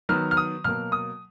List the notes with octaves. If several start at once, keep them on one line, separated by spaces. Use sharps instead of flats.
D#3 F#3 B3 F6
F6
D#6
B2 F#3 A#3 F6
D#6